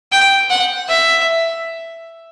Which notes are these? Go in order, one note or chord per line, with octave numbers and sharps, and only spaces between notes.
G5
F#5
E5